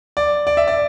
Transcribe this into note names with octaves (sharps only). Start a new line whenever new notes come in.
D5
D5
E5
D5